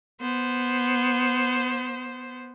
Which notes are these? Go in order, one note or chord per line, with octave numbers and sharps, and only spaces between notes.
B3 C5